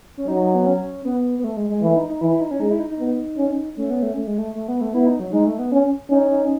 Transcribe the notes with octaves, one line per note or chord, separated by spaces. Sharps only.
C#4
F#3 D#4
B3
C#4
B3
B3
A3
G#3
G#3
E3 A3
D#4
D#4
E3 E4
E4
D#4
C#4
G#3 D#4
E4
D#4
D#4
B3
C#4
A3 C#4
B3
A3
A3
G#3
A3
A3
B3
A3
B3 E4
D#4
F#3
G#3 D#4
A3
B3
C#4
C#4 D#4
D#4